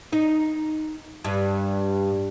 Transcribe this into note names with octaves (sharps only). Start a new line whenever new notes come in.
D#4
G2